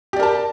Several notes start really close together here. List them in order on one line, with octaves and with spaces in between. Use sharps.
G4 D5 A#4 A5